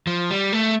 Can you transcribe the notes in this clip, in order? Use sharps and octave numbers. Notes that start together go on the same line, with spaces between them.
F3
G3
A3